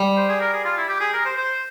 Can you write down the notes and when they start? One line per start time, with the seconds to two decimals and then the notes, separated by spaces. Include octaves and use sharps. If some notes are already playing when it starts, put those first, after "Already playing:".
Already playing: G3
0.17 C5
0.29 G#4
0.41 A#4
0.53 G#4
0.65 F4
0.77 E4
0.89 G4
1.00 G#4
1.13 A#4
1.25 C5
1.37 C5